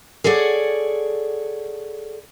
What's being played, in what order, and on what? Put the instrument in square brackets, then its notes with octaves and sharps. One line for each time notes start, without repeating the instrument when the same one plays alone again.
[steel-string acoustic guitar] G#4 A4 C#5 D5 F#5